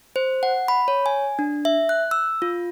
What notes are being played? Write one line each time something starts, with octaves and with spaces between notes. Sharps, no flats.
C5
F#5
B5
C#5
G#5
D4
E5
F#6
E6
F4